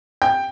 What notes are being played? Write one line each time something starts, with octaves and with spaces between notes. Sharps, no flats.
G5